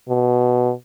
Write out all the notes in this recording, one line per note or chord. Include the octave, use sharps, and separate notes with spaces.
B2